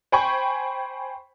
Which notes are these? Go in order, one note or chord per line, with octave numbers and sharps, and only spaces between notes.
C5 G5 G#5 B5 C#6